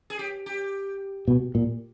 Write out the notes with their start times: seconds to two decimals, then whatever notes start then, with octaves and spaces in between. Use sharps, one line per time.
0.10 G#4
0.19 G4
0.46 G4
1.28 B2
1.55 A#2